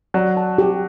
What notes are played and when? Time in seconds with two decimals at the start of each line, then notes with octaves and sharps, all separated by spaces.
0.14 F#3 D5
0.37 A5
0.58 G4